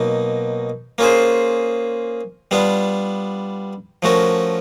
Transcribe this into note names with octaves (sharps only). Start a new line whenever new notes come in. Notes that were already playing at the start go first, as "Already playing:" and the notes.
Already playing: B2 F#3 A#3 D#4
A#3 C#4 F4 G#4 C5
G3 B3 D4 F4
F3 A3 C#4 F#4 A#4